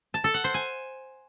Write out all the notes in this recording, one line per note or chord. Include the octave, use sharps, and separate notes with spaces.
A5
A4
F#5
C5
G#5